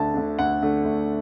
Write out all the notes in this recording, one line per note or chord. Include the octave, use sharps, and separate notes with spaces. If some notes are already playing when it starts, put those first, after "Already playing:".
Already playing: D2 D3 A3 D4 A5
D3 A3 D4
D2 F#5
D3 A3 D4
D2